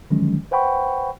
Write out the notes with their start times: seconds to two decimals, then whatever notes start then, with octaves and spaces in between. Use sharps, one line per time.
0.10 D3 D#3 F3 F#3 G#3 C#4
0.51 B4 C5 F#5 G5 B5 C#6